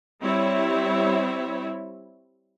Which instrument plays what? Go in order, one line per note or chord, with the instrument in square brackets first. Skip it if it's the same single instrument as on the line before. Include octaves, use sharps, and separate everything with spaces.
[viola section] G3 C4 E4 C#5 E5